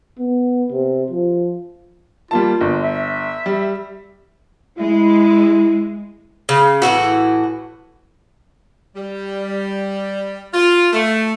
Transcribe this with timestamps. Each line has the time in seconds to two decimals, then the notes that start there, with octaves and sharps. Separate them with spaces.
0.20 B3
0.72 C3
1.11 F3
2.31 G3 A#3 F4 A5
2.61 G1
2.83 E5
3.46 G3
4.78 G#3 E4
6.49 C#3
6.82 A2 C#3 E3 F#4
8.96 G3
10.52 F4
10.93 A3